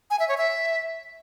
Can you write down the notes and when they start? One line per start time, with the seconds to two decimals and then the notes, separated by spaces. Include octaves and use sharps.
0.10 G#5
0.19 E5
0.28 C#5
0.37 E5